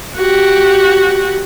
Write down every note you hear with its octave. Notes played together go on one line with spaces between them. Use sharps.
F#4 G4